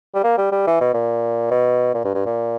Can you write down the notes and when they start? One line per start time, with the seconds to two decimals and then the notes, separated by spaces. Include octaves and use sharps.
0.14 G3
0.24 A#3
0.37 G3
0.52 G3
0.67 E3
0.80 B2
0.94 A#2
1.51 B2
1.94 A#2
2.04 G2
2.14 G2
2.26 A#2